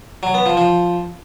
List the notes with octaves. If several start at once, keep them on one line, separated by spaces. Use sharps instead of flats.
F#3
B3
F3
F3